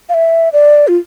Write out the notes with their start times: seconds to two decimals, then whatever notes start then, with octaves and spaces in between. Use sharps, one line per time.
0.09 F5
0.14 E5
0.53 D5
0.88 F4